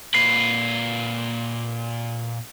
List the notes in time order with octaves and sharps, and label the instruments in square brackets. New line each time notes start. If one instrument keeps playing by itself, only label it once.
[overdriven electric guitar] A#2 B4 [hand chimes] C7